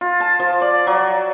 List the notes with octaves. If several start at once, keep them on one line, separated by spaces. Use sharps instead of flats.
F4
A5
F3
D5
F#3